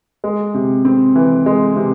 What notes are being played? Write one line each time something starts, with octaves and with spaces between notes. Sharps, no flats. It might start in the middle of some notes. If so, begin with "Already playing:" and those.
G#3
C3
C4
E3
G#3
C3